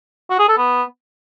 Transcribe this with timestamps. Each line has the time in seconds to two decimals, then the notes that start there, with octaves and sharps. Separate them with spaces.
0.30 F#4
0.39 G#4
0.49 A4
0.58 B3